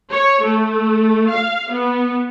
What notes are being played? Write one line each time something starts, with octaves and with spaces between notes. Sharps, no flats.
C#5
A3
F5
B3